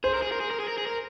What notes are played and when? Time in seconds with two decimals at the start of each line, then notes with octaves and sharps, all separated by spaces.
0.04 G#4 C5
0.14 A#4
0.22 G#4
0.32 A#4
0.41 G#4
0.51 A#4
0.60 G#4
0.68 A#4
0.78 G#4
0.87 A#4